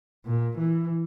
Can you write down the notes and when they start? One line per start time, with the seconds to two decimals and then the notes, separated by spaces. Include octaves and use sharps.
0.25 A#2
0.58 E3